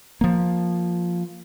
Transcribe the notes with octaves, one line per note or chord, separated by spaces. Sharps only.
F3 A#3